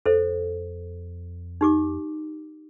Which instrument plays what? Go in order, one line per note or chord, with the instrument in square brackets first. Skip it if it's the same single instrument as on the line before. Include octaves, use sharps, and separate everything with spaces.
[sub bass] F2 [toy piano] A4 C5 E5
[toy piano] D#4 G4 D6